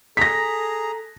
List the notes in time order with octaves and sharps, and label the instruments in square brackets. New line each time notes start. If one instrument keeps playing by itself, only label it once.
[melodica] G#4 A#5 [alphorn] A4 [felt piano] A#6 B6